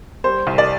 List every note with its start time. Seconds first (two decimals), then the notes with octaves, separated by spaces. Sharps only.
0.24 G3 C5
0.47 C2
0.58 D5